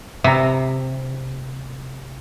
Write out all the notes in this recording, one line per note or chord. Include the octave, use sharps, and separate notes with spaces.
C3 E5 A#5